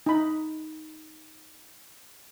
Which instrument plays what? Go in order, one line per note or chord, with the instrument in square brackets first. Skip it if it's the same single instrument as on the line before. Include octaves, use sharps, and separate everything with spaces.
[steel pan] D#4 B5